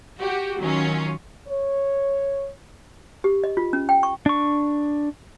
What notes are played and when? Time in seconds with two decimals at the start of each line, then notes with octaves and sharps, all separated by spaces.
0.18 F#4 G4
0.59 D#3 F#3 C#4 F4
1.48 C#5
3.24 G4
3.44 D#5
3.57 F4
3.73 C#4
3.89 G5
4.03 C#6
4.26 D4 C#6